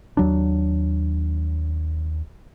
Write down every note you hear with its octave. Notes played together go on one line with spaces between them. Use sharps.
D#2 F#3 D4